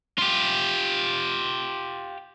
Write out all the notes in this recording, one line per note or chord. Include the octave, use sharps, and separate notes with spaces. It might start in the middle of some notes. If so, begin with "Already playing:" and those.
F4 G4